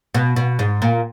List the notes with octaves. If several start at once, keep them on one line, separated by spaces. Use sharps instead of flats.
B2
B2
G#2
A#2